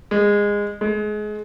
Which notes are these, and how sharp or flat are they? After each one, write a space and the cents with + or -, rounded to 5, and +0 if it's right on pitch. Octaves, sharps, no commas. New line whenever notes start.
G#3 -20
G#3 +25